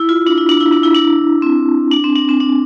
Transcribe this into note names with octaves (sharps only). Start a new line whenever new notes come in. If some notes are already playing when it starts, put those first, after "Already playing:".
Already playing: E4
F4
D4
E4
D4
E4
D4
E4
D4
C4
D4
C4
D4
C4
D4